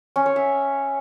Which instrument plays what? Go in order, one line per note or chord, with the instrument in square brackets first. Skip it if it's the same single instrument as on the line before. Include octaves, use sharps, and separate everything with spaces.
[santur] C#4
C#5
E5